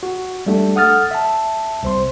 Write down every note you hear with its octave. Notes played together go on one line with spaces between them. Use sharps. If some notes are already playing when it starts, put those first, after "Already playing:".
F#4
G3 A3 D4
A4 F#5 D#6 F6 A6
E5 A5
C2 C5 C6